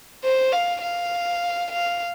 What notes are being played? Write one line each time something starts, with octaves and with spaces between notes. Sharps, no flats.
C5
F5
F5
F5